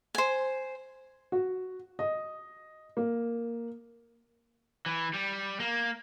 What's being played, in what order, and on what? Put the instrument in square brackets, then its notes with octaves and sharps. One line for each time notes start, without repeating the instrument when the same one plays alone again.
[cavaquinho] C5 G#5
[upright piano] F#4
D#5
A#3
[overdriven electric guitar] E3
G3
A#3